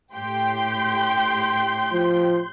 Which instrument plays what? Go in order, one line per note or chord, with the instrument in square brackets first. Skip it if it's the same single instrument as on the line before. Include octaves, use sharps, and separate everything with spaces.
[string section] A2 G4 G5 [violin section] C6 G6
[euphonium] F3